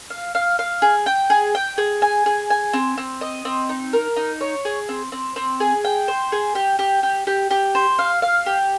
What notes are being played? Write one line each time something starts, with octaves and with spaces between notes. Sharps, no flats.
F5
F5
F5
G#4
G5
G#4
G5
G#4
G#5
G#4
G#5
C4
C4
D#5
C4
D#4
A#4
D#4
C#5
G#4
C4
C4
C4
G#4
G5
C5
G#4
G4
G4
G4
G4
G4
C5
F5
F5
G4